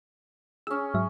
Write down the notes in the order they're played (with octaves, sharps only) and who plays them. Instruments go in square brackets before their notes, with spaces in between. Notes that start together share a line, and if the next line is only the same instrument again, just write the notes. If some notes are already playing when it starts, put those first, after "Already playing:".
[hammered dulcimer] C#4 G#4 [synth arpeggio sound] E6
[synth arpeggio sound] G#2 F#3 E5